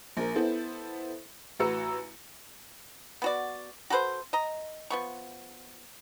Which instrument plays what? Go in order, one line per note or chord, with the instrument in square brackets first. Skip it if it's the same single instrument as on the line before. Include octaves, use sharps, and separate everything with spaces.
[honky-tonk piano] A#1 A#4
B3 E4 A4 C5
A1 F#4 B4 A#5 E6 C#7
[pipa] B3 F#4 D5
F#4 A4 B4 C5
D#5 A#5
F3 B3 C#6